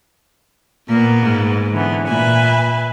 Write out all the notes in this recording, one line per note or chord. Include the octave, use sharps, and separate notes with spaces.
A#2 A#3 B3
G#2
D3 E3 B3
A#2 B4 E5 G#5